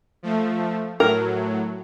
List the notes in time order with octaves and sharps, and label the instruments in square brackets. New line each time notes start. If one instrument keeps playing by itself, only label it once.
[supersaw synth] F3 A3
[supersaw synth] A2 F#3 [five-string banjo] A#4